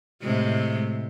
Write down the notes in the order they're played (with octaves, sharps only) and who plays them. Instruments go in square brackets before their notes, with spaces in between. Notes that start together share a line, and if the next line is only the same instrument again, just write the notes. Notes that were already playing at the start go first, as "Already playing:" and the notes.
[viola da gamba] A2 C3 G#3